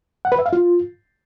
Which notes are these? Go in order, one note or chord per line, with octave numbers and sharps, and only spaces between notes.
F#5
B4
E5
F5
F4